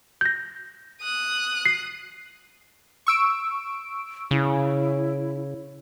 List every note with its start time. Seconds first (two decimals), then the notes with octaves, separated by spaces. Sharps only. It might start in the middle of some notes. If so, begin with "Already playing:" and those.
0.21 G6 A#6
1.02 D#6 F#6
1.66 C7
3.07 C#6 E6 D7
4.31 C#3 E4